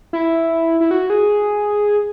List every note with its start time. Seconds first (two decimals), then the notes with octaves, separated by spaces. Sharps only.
0.13 E4
0.80 E4
0.91 F#4
1.10 G#4